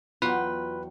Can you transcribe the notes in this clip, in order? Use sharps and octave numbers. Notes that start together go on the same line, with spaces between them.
E2 F#3 F4 B4 G5